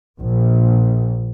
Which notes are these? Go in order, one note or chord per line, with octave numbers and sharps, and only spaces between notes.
A#1